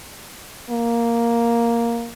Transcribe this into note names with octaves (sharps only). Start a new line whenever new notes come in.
A#3